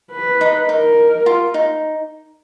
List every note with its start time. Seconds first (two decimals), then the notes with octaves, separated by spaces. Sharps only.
0.12 B4
0.41 D#4
0.69 D#4 A#4
1.26 F4
1.54 D#4